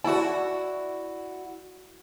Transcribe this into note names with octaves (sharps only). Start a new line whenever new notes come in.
E4 F#4 D5 A5